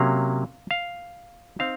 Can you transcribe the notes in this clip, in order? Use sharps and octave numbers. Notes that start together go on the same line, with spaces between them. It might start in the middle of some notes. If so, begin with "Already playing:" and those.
Already playing: C3 F#3 A#3 C#4 F5
F5
C4 D#4 F5